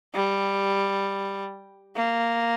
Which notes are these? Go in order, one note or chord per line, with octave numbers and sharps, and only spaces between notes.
G3
A#3